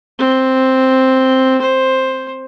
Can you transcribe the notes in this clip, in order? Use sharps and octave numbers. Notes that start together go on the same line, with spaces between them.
C4
C5